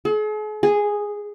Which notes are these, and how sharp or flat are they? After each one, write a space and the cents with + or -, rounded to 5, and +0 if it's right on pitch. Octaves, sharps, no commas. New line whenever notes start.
G#4 +45
G#4 -5